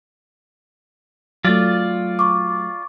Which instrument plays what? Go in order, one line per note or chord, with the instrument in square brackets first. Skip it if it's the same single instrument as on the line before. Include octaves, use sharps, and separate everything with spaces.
[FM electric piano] F#3 A3 [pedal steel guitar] F4 D5
[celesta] C#6 D6